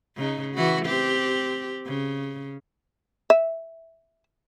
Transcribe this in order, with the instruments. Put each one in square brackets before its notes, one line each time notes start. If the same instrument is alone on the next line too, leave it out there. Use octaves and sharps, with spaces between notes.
[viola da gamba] C#3 D#4
E3 F#4
C4 G4
C#3
[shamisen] E5